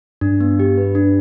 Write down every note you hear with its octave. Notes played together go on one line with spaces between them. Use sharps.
G2 D4
B3
G4
B4
D4